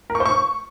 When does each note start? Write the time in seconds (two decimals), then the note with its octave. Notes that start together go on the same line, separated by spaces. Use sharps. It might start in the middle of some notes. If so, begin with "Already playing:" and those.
0.10 A#4
0.15 C#6
0.20 C5
0.26 C#6